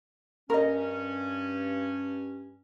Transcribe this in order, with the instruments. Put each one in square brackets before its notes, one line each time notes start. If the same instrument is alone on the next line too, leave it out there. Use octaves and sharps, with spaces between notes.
[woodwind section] G2 C#4 [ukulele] A#4 D#5